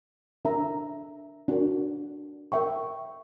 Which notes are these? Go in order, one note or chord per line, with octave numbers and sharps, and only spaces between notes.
D4 A#4 E5 A#5
D4 F#4 A#4 D5
A#4 E5 G5 C#6